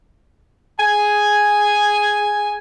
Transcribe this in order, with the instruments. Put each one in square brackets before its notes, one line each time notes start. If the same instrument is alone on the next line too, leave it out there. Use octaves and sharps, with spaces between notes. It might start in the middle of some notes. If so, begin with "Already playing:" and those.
[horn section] G#4 G#5